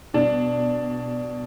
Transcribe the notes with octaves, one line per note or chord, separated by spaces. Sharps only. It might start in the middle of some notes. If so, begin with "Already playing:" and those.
B2 D4